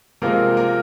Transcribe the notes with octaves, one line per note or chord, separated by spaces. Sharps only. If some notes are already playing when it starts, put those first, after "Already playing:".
C3 F3 G#3 A#3 A#4
A#3 A#4